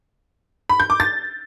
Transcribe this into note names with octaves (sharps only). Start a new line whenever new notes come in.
B5
G6
D6
A6